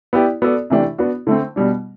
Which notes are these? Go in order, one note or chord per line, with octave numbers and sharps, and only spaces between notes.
B3 E4 G4 D5
B3 F#4 A4 D5
C3 E3 A3 D4 G4
B3 D4 F#4
D3 A3 C4
B2 G3 D4